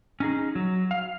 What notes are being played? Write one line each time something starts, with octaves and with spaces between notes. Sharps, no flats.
C#4 D#4 G#4
F#3
F5